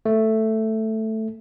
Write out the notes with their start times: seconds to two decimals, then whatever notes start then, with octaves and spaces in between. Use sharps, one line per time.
0.05 A3